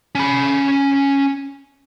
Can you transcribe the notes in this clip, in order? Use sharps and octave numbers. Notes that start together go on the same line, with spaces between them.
C#4 B5